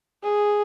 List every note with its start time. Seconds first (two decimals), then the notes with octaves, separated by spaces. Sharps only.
0.23 G#4